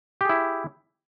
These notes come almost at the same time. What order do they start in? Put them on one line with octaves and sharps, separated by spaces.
G4 G#4 E4